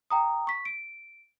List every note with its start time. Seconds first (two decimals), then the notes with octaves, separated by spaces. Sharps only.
0.10 G5 A#5 D#6
0.47 C#6 B6
0.65 D7